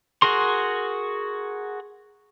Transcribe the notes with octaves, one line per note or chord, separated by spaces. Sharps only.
F#4 G#4 A#4 C6